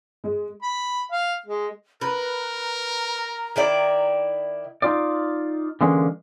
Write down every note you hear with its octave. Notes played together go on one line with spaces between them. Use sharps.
G#3
B5
F5
G#3
A#4 B4 A#5
D#3 E4 D5
D#4 F4 D5
D3 E3 G#3 A#3 C#4